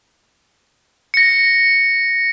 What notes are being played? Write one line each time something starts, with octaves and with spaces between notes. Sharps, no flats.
A#6 C#7